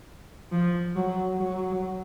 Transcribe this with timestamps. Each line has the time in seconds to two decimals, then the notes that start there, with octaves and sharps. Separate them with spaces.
0.52 F3
0.96 F#3
1.38 F#3